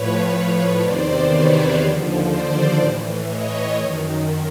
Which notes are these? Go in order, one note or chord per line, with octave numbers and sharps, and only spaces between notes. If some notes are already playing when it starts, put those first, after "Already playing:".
Already playing: A2 F3 B4 C#5
E2 C3 D#3 C5 D5
B4 C#5
D#2 D3 F3
C5 D5
A2 E3
C#5 D#5
F#2 D#3